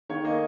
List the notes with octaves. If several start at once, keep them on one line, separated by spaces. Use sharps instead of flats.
D#3 C#5
A#3 D#5